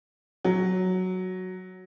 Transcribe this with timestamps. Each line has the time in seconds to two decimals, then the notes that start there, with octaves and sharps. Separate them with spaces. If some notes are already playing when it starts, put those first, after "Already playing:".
0.45 F#3